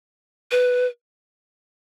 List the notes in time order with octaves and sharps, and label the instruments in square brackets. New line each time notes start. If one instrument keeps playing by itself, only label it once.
[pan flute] B4